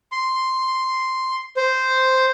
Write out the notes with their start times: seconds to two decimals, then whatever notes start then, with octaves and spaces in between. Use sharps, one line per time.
0.12 C6
1.56 C5